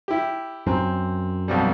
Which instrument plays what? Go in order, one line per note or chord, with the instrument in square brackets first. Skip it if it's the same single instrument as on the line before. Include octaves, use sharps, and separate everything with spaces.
[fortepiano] E4 G4
[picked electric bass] F#2 [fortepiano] C4
[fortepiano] B1 F2 G3